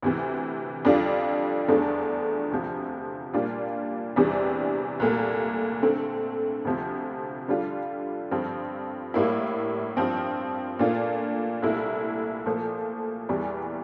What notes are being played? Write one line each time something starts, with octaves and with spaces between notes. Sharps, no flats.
D2 C3 E3
F2 D3 G3 D4 F4
E2 D3 F3 A3 D4
D2 C3 F3
A#2 G3 D4 F4
E2 C3 E3 G3 D4
C2 A#2 A3
D3 A3 C4
D2 C3 F3
D3 G3 D4 F4
G2 D3 F3 C4
A2 G3 A#3 E4
G2 F3 C4
A#2 A3 D4 F4
C2 A#2 A3 E4
A#2 F3 A3
E2 E3 G3